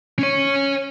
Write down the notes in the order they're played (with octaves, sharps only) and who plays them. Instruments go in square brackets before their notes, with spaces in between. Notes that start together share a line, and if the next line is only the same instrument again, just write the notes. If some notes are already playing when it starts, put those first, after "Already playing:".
[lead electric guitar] C#4 C#5